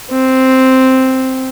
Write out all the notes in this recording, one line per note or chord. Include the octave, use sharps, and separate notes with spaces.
C4